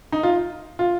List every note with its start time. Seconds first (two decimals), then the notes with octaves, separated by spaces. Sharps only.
0.12 D#4
0.23 F4
0.79 F4